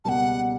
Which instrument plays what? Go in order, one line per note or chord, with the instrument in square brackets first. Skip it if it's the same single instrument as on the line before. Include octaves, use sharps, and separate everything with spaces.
[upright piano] C#2 B2 G3 A#3 [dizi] F#5 A5